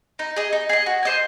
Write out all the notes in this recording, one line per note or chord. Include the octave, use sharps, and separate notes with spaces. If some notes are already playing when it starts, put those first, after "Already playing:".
D#4
G#4 D#5
D#4
G#4 D#5
F#4
C5 D#5 G#5